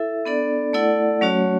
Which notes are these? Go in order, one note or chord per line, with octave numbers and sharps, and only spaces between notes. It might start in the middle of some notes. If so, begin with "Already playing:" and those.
Already playing: E4 A4 E5
B3 D4 A4 D5
A3 E4 A4 D5 F#5
F#3 A3 C#4 F#4 C#5